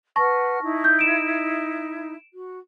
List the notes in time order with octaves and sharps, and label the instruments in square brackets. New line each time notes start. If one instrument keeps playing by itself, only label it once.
[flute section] B4 F#5 F6 [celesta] A5 C#6 A#6
[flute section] D#4 E4
[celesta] G6
D7 E7
[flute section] F#4